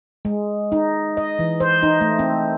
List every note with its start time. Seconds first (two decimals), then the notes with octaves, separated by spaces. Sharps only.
0.25 G#3
0.72 D#4
1.17 D#5
1.39 E3
1.60 C5
1.83 D#4
2.01 A3
2.19 C4